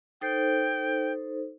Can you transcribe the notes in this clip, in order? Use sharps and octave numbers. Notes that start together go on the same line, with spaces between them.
D#4 A4 C5 G5